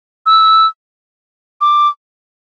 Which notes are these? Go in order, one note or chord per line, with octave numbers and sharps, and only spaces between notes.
E6
D6